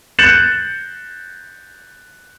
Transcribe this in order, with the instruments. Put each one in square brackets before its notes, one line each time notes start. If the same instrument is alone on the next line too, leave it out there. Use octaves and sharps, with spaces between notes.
[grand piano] F#6 G6 A6 C#7 E7 F#7